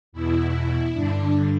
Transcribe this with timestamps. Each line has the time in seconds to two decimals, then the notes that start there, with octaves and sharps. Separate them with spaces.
0.12 E2 B2 E4
0.93 G2 D3 D4